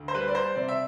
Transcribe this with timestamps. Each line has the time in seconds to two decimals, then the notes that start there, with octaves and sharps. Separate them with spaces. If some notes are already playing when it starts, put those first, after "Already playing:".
Already playing: D2
0.08 C5
0.14 G3 B4
0.28 D5
0.35 C5
0.55 C3 D5
0.68 E5